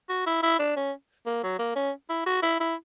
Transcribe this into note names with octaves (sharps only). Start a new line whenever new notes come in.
F#4
E4
E4
D4
C#4
A#3
F#3
A#3
C#4
E4
F#4
E4
E4